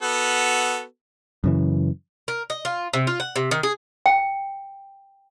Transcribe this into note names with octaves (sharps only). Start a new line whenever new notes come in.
B3 F#4 A4
F#2 C#3 E3
A#4
D#5
F4
C3
F4
F#5
C3
D#3
G#4
G5